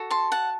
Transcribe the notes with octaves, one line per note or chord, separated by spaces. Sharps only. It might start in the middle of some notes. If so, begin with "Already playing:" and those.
Already playing: F#4 A4
A5 C6
F#5 A5